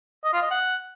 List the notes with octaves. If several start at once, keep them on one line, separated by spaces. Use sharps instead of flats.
D#5
F4
D#5
F#5